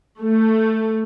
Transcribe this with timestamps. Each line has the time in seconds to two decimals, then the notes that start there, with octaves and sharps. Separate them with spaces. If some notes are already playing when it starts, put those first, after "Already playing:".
0.21 A3